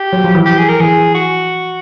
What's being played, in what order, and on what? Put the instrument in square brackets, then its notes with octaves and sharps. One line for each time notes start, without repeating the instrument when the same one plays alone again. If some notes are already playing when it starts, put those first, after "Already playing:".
Already playing: [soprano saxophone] G4
[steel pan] F#3
F3
E3
[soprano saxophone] G4
G#4
A#4
[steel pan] E3 [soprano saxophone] G#4
[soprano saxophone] F#4